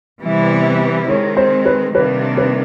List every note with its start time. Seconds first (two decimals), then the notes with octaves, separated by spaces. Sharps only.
0.23 C3 E3 G3 B3 E4
1.08 D#3 G#3 C4 C#5
1.37 C5
1.66 B4
1.94 C3 D#3 G3 A#3 D4 B4
2.37 B4